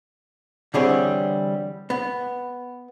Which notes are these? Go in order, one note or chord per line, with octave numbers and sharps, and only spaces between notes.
D3 E3 G3 C4 G#4 C#5
B3